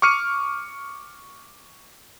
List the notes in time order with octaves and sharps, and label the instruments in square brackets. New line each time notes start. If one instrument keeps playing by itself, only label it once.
[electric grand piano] C#6 D6 F6 C#7 D#7